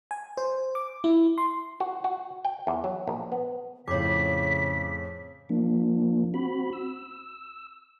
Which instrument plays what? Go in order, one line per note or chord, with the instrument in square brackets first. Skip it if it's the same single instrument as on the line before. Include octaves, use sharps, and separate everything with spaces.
[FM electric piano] G#5
C5
D6
E4
C6
[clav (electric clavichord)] F#4
F#4
G5
E2
F#3
A#1
B3
[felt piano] F2 A2 [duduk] C#3 [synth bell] C#5 D6 [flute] B6
[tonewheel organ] F3 A#3 D4
C4 F#4 B5
E6